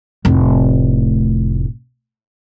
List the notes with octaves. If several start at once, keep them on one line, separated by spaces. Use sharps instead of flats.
F1 A2